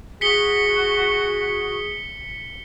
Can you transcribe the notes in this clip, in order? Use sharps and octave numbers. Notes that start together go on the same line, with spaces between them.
F#4 G#4 B6 C#7 G7